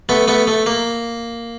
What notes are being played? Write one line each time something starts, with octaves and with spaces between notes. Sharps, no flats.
A3 B3
A3 B3
A3
A#3